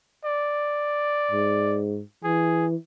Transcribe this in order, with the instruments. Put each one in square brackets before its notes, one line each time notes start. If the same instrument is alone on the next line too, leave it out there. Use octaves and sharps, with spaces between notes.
[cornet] D5
[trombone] G#2
[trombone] E3 [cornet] G#4